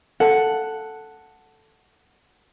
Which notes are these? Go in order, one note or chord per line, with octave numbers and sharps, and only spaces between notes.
A4 F#5